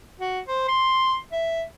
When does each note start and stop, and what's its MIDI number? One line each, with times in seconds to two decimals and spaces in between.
0.19 0.40 66
0.47 0.63 72
0.68 1.16 84
1.32 1.63 76